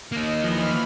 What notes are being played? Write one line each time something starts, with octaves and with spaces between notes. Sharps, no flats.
A#3 D#4 D#5
E3 F3 B5 F6